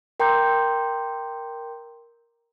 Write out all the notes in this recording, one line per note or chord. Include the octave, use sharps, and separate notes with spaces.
A#4 G5 A#5 C6 D6 G6